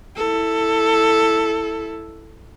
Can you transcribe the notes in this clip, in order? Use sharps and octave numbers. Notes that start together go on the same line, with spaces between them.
E4 A4